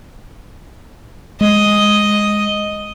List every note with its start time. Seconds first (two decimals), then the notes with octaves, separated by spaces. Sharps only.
1.41 G#3 D#5